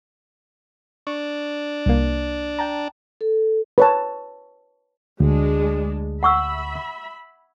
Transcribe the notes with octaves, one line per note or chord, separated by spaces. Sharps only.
D4 C#6
C2 A#3
G5 A5 A#5
A4
B4 C#5 A5
D2 G#3 D4
E5 F#5 B5 C#6 E6